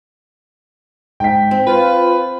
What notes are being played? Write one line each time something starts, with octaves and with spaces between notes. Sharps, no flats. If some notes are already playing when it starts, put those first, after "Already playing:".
G#2 G5 B6
C4
F4 B4